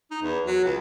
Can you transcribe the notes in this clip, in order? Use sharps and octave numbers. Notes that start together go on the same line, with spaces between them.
D#4
E2
F#3
C#2